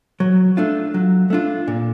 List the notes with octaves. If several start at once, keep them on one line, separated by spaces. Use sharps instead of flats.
F#3
A3 D4 F4
F#3
A3 D4 F4
A#2